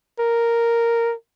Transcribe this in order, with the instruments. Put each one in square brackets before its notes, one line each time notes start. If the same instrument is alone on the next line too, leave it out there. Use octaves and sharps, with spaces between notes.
[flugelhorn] A#4